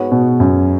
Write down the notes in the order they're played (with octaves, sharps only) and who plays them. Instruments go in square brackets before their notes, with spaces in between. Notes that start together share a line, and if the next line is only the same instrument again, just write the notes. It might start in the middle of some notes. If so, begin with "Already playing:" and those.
Already playing: [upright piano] G#2 G#3 B3 F#4 C#5
[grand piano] B2
F#2